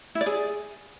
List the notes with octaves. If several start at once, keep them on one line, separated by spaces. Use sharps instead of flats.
E4
D5
G#4